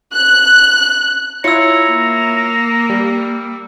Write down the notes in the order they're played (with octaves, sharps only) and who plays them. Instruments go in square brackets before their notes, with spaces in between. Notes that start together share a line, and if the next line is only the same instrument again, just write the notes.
[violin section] F#6
[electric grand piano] E4 F4 C#5 [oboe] A#5 [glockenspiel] E6 C#7
[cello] A#3
[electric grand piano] G3